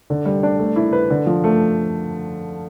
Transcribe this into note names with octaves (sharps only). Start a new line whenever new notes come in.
D3
G3
D4
A3
E4
B4
D3
F3
A3